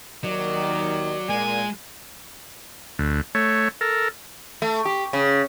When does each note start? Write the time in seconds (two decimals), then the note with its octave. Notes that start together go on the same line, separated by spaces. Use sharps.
0.24 D#2 D#3 F#3 D5
1.29 A#2 G#3 G#5
2.99 D2
3.35 A3 C#5
3.81 A4 A#4
4.62 A3
4.85 G4
5.13 C#3